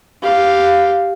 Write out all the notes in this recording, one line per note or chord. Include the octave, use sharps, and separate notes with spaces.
G4 F5